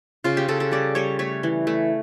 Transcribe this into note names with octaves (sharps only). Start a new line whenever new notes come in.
C#3 F4
G4
C#3 A4
A4
G3 D5
G3 C#5
A3 C#5
E3
A3